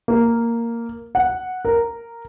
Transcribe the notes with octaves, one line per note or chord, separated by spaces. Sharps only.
A#3
F#5
A#4